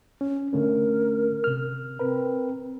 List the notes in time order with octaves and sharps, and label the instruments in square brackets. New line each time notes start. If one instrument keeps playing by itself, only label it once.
[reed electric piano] C#4
[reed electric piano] D3 A3 C#4 [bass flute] A#4
[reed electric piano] C3 F6
[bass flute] C4 [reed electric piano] A#4 B4